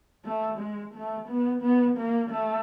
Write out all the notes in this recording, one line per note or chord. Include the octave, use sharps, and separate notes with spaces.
A3
G#3
A3
B3
B3
A#3
A3